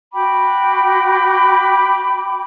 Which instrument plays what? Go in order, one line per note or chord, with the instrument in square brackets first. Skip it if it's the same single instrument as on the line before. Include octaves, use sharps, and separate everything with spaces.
[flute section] F#4 G5 B5 D6